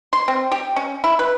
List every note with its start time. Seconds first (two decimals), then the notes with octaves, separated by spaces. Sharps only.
0.13 C6
0.28 C4
0.52 G4
0.76 C#4
1.04 E4
1.19 B4